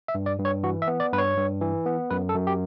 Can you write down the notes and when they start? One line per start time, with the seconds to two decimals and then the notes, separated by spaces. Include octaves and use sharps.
0.08 E5
0.15 G2
0.26 D5
0.39 G2
0.45 C#5
0.63 E3 F#4
0.82 E5
0.88 B3
1.00 D5
1.12 G2 B4
1.18 C#5
1.37 G2
1.61 E3
1.86 B3
2.11 F#2 B4
2.29 A4
2.35 F#2
2.47 G4